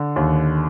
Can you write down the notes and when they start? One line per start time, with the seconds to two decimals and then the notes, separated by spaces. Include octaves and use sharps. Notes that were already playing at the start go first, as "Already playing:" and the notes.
Already playing: D3
0.16 D#2